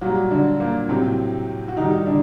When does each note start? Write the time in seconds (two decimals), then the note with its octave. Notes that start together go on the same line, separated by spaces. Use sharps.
0.01 A#2 F#3 G3 F#4
0.31 D3 D4
0.60 A#2 A#3
0.89 A2 C3 F#3 C4
1.68 F#4
1.77 A2 D#3 G3 D#4
2.06 D3 D4